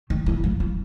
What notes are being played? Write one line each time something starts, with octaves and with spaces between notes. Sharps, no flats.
D#3
E3
F3
F3